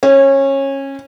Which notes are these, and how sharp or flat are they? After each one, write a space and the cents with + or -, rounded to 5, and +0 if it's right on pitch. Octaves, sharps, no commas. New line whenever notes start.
C#4 -20